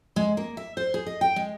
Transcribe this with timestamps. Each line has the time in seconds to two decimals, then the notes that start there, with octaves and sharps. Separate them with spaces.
0.16 G#3
0.37 A#3
0.57 E5
0.77 C5
0.94 G#4
1.06 D#5
1.21 G5
1.36 G#3